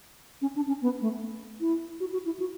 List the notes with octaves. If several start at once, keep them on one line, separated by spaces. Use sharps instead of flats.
C#4
D4
C#4
B3
A3
E4
F#4
F#4
E4
F#4